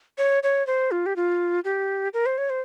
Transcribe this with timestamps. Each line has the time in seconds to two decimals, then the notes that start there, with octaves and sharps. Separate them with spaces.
0.18 C#5
0.43 C#5
0.67 C5
0.91 F4
1.06 G4
1.16 F4
1.64 G4
2.14 A#4
2.26 C5
2.38 C#5
2.50 C5